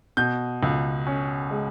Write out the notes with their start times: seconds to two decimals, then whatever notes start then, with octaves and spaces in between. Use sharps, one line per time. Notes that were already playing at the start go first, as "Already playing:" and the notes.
0.17 B2 G6
0.63 C#2
1.07 C#4
1.51 G#3